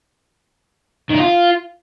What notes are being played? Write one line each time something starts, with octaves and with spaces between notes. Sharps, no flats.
D#3
D#4
F4